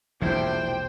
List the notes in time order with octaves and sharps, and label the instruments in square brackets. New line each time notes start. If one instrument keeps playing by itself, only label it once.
[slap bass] E1 A#1 C3 [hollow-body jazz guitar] F3 E4 [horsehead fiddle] D4 G5 [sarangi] C5